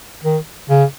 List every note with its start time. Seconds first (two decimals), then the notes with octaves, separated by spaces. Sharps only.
0.23 D#3
0.70 C#3